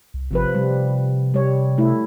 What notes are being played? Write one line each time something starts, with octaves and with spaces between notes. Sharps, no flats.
C2
G#1 C3 F3 B4
C3 G3
G3 C#5
A3 E4